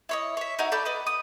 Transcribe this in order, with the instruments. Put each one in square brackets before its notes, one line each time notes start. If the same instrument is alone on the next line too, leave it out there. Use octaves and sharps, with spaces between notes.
[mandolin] E4 C#5 D#5
C#5 E5
D#4 E4 F#4 A#4
A4 D5 B5 G6
B4 D#5
D#6